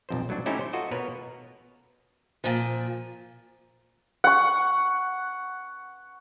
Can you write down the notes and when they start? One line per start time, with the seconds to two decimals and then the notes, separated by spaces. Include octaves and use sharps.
0.09 B1 F2 C5
0.29 A2 F#3 A3 D4
0.46 A3 C#4 D#4 E4 G4 C5
0.61 C5
0.73 F4 F#4 A4 D#5
0.91 B2 A#4 B4 C#5
2.44 A#2 F3
4.24 F#5 C#6